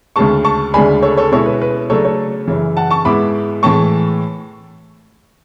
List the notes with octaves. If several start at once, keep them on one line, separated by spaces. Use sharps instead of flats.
D2 C#3 G#3 A5 C#6
A5 C#6
D2 C#3 G#3 D4 G#5 B5
A4 C#5
A4 C#5
B2 G#3 C#4 E4 A4 C#5
B4
B4
C#3 F#3 A3 D4 A4 C#5
A4 C#5
F#2 C#3 E3
F#5 A5
A5 C#6
G#2 G#3 B3 E4 B5 D6
A2 E3 G#3 A5 C#6